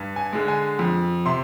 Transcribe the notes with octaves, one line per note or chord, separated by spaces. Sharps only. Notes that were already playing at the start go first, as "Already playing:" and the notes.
Already playing: G2
G#5
D3 G#3
G#5
F2
C3 C6